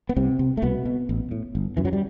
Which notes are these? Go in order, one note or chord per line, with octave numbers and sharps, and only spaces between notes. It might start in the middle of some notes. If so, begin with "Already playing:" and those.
B3
C2 C3 C4
C3
A3
C2 B2 B3
B2
A1
A2
G1
F#2 E3
F#3
G3